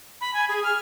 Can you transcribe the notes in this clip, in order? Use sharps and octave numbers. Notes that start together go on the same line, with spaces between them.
B5
G#5
G#4
F6